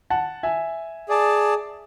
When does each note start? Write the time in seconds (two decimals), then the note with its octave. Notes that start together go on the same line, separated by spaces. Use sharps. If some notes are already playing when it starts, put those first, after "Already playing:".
0.10 F#5 A5
0.43 E5 G#5
1.09 G#4 D5 A5